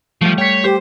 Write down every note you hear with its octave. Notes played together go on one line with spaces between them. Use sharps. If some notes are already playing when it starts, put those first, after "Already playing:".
F3 G3 A3
C#5 G5 B6
G4 C5